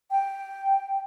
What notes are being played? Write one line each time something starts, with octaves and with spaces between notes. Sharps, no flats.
G5